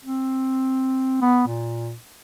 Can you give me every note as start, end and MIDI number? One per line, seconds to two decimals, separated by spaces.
0.04 1.21 60
1.22 1.45 59
1.48 1.95 46